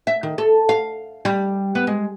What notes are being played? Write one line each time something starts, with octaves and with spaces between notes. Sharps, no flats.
E5
D#3
A4
F5
G3
B3
G#3